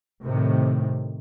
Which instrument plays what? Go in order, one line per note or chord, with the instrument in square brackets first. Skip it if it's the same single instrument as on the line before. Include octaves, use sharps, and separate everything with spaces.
[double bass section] A2 C3 D#3